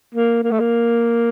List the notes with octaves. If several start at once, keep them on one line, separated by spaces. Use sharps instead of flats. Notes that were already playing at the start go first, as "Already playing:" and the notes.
A#3
A#3
A3
A#3